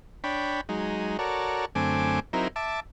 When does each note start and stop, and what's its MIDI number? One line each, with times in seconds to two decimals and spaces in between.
0.24 0.61 62
0.24 0.61 73
0.24 0.61 79
0.24 0.61 83
0.69 1.17 54
0.69 1.17 56
0.69 1.17 63
1.19 1.65 66
1.19 1.65 69
1.19 1.65 70
1.19 1.65 73
1.19 1.65 74
1.75 2.20 42
1.75 2.20 50
1.75 2.20 57
1.75 2.20 60
1.75 2.20 80
1.75 2.20 86
2.33 2.48 54
2.33 2.48 60
2.33 2.48 63
2.33 2.48 64
2.33 2.48 70
2.56 2.80 76
2.56 2.80 81
2.56 2.80 86